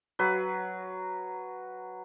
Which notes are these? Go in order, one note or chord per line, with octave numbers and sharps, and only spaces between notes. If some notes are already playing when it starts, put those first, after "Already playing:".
F#3 B4